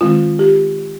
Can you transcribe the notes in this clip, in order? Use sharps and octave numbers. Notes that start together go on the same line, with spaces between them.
D#3 G#3 C4 F4
G4